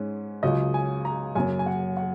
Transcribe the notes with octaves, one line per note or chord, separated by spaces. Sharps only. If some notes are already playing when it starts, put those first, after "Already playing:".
Already playing: G#2 G#3 C#4
C#2 C#3 F#3 D#5
G#5
A#5
F#2 C#3 A#3 C#4 G#5
G#5
F#5
F#5